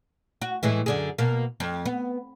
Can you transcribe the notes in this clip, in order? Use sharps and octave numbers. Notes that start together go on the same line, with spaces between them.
F#4
A2 E3 G#3
F#2 D3 G#4
B2 A#3
F2
B3